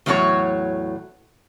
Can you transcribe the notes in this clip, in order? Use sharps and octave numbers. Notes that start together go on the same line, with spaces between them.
E2 A2 F#3 A3 F#4 C#5